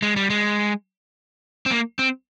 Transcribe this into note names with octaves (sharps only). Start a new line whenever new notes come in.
G#3
G3
G#3
C4
A#3
C4